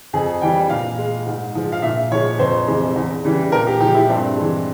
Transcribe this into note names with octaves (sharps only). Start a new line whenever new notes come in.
F2 G#4
E3 G3 G5
A#2 F5
G#3
G#2
F3 G#3
F5
A#2 E5
F3 G#3 C#5
F2 C5
C3 E3 G#3
E2
C#3 E3 G3
A#2 A#4
G4
F3 G#3 G4
E4
G2 C4
E3 G#3